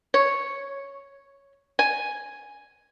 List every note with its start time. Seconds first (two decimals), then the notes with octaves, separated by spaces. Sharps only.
0.14 C#5
1.79 G#5